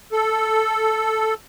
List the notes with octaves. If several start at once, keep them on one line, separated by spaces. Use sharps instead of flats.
A4